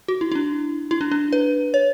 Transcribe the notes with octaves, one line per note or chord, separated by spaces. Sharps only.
F#4
E4
E4
D4
E4
D4
D4
B4
C#5